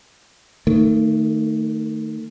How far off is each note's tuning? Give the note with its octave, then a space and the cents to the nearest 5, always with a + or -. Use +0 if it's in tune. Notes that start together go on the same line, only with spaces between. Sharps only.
D#3 +0 A3 +35